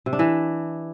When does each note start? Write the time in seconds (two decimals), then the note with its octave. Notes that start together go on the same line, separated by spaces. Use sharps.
0.06 C3
0.13 D4
0.19 E3